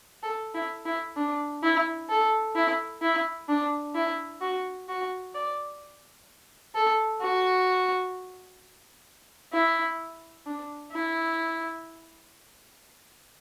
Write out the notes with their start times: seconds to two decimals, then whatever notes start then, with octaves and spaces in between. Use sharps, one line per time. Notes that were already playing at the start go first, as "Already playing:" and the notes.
0.23 A4
0.54 E4
0.85 E4
1.16 D4
1.63 E4
2.10 A4
2.55 E4
3.02 E4
3.49 D4
3.95 E4
4.41 F#4
4.89 F#4
5.35 D5
6.75 A4
7.21 F#4
9.53 E4
10.46 D4
10.92 E4